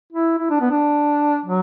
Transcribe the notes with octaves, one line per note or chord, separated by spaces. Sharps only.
E4
E4
D4
B3
D4
F#3